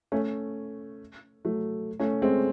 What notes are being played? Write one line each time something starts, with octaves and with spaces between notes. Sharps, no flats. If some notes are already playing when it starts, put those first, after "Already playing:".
A3 C#4
F#3 A3
A3 C#4
G#3 C4